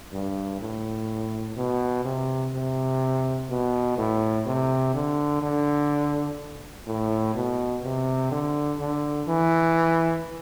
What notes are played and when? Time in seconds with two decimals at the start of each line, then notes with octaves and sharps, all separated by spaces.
0.13 G2
0.61 A2
1.57 B2
2.05 C3
2.53 C3
3.50 B2
3.98 A2
4.46 C3
4.94 D3
5.42 D3
6.87 A2
7.35 B2
7.83 C3
8.31 D3
8.80 D3
9.28 E3